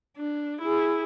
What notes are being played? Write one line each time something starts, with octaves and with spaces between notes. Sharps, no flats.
D4
E4 G#4